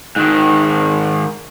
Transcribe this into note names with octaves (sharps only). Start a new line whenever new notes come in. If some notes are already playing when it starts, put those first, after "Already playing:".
G#2 D#3